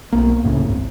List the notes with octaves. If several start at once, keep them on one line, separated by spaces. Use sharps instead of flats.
B1 A#3
C#2 F#2 A2 C#3
G#1